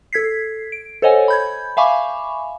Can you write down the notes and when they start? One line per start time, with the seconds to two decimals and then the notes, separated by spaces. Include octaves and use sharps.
0.13 A4 G#6 B6 C7
0.72 D7
1.02 A4 C5 C#5 D#5 F#5 G#5
1.28 B5 G6 G#6
1.77 E5 F5 G#5 B5 C#6 D6